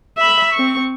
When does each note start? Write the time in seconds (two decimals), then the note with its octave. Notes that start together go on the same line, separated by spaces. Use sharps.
0.18 E5 B5
0.54 C4 C#6